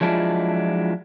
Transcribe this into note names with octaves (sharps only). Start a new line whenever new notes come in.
F3 F#3 G#3 D4 E4 F4